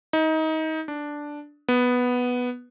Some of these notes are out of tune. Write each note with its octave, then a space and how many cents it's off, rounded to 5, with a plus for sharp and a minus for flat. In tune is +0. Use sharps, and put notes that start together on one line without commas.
D#4 +25
D4 +0
B3 +0